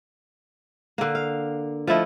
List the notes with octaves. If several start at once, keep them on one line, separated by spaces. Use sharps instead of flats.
D3 A#3
F5
F3 A3 E4 D#5